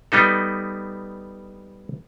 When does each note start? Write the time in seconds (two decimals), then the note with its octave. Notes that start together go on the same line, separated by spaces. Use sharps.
0.12 G3 B3 D#4 A4